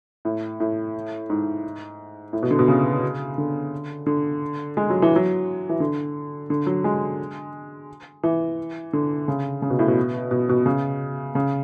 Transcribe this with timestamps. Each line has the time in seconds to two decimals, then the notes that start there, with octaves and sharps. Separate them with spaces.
0.25 A2
0.60 A2
1.30 G#2
2.33 A2
2.43 B2
2.51 D3
2.59 B2
2.68 C#3
3.38 D3
4.06 D3
4.77 G#3
4.90 F#3
5.02 E3
5.16 F#3
5.69 E3
5.80 D3
6.50 D3
6.67 F#3
6.84 G#3
8.23 E3
8.93 D3
9.28 C#3
9.62 C#3
9.70 B2
9.79 A2
9.88 B2
10.31 B2
10.49 B2
10.66 C#3
11.35 C#3